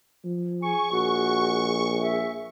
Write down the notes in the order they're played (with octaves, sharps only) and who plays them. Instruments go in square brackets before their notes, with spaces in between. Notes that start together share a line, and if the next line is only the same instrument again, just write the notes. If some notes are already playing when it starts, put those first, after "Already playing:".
[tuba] F3
[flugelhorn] G#4 [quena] G#5 [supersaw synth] C#6
[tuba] A#1 [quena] F#4
[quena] E5